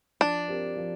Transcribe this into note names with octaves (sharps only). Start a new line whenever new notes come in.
F3 D4
C4 G4 A#4
F3